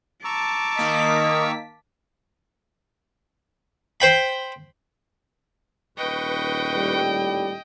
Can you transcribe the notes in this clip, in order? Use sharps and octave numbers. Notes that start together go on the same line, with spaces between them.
A5 A#5 C#6 D6 E6
D#3 A#3 D#5 B6
C5 G5 B5
D#1 B4 D#5 G5 C#6
A2 G3